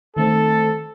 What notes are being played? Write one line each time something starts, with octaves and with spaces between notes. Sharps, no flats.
D#3 A3 C4 A4